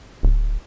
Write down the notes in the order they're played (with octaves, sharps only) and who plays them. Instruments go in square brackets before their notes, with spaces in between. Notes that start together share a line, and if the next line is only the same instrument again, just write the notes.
[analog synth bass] D1